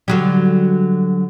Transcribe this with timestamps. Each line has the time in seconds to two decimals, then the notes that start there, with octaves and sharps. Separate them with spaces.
0.08 D3 F#3 G3